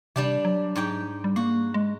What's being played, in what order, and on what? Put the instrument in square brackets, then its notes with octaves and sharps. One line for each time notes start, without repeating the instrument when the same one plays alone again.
[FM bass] C3 [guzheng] G3 D4 G4
[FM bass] F#3
[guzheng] G#2 G4 G5
[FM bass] G3
[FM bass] A#3 [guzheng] F#4
[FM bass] G#3